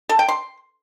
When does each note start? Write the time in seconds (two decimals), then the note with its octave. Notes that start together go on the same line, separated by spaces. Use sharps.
0.09 A4
0.19 G5
0.29 C6